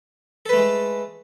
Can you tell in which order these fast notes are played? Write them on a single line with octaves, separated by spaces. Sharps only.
A4 B4 A3 G#3